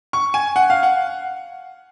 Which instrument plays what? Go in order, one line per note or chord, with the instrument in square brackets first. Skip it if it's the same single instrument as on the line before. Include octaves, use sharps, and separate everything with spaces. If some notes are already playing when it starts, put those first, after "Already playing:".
[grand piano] C#6
G#5
F#5
F5
F#5